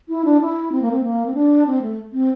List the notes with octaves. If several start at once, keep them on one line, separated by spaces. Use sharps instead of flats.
E4
D4
E4
C4
A#3
C4
A#3
C4
D4
C4
A3
C4